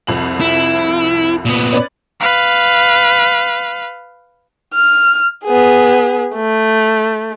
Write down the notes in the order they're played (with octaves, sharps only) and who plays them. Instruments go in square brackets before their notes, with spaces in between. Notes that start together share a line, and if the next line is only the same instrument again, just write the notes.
[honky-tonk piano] C2 F2 F#7
[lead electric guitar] E4
A#2 B3
[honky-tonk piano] C#4 B4 D5
[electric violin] B4 F5
[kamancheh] F6
B3 G#4
A3